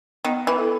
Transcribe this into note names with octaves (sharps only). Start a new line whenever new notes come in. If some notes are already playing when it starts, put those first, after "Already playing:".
D#3 B3
E3
E4 A4